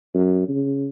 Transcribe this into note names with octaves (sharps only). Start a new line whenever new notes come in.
F#2
C#3